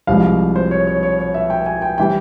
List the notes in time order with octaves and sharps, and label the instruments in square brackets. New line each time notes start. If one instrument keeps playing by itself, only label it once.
[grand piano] C2 C3 F3 G#3 F5
C5
C#5
C#5
C#5
C#5
E5
G5
G#5
G5
E3 G3 G5